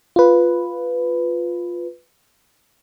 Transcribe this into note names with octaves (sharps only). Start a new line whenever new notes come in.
F4 B4